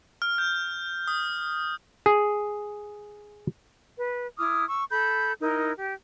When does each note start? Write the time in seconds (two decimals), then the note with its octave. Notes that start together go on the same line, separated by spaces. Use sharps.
0.22 F6
0.38 G6
1.08 D#6
2.06 G#4
3.97 B4
4.38 E4 D6 D#6 F6
4.68 C#6 E6
4.91 A4 B5 G6
5.40 D#4 E4 A#4
5.76 G4